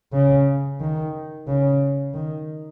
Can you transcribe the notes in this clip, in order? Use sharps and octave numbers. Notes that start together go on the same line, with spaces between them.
C#3
D#3
C#3
D#3